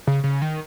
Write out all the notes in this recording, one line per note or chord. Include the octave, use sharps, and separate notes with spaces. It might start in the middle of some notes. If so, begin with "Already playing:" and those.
C#3
C#3
D#3